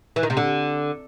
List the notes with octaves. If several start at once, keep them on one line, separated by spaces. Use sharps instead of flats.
E3
D#3
C3
D3